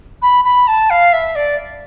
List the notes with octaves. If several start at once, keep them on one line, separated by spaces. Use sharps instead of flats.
B5
B5
A5
F5
E5
D5